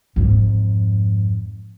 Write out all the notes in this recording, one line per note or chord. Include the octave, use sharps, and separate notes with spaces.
F2 G#2